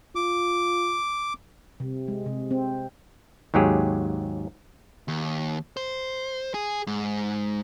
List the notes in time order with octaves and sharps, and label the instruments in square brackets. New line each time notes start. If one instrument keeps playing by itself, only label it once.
[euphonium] F4 [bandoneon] D6
[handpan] C3
G#3
C3
C4
[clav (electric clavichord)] D#2 G#2 F#3 G4 G#4
[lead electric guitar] D#2
C5
G#4
G#2